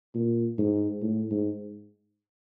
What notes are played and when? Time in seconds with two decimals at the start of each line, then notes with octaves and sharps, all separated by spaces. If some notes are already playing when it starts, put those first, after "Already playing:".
0.15 A#2
0.58 G#2
1.02 A2
1.30 G#2